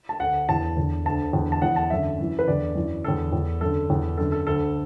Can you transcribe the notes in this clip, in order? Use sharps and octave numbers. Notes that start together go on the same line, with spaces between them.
A5
D2 D3 F#5
E2 E3 A5
E2 D3
D2 D3 A5
E2 D3
A5
E2 E3 F#5
A5
F#2 D3 E5
F#2 E3
B4
E2 D3 D5
F#2 E3
E2 D3 A4
E2 E3
F#2 D3 A4
E2 E3
F#2 D3 A4
A4
D2 D3 A4